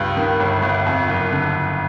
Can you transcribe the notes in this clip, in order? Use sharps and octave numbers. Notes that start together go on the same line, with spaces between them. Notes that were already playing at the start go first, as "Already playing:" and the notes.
Already playing: C#2 G2
D#3
G1
G1
F2
F#1
D3